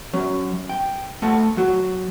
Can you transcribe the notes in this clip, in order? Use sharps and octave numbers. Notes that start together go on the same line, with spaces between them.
F#3 C#4
G5
A3 F#5 A5
F#3 F#4